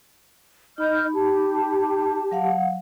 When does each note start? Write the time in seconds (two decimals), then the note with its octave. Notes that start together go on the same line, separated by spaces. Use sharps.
0.78 D#4 D#5 B5 F6 G6
1.13 G4 A5
2.31 F#3 F5 F#5